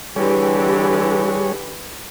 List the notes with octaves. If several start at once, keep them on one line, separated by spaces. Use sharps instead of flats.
D3 E3 G3 G4 G#4 C#5